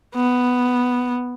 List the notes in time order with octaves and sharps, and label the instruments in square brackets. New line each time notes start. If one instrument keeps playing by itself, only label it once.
[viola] B3